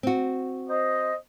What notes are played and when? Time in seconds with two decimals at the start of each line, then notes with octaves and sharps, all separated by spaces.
0.03 C4 F#4
0.69 C5 D#5